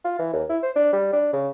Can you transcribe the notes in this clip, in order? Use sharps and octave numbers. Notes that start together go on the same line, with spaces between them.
F4
E3
D#2
E4
C5
D4
G3
D4
C#3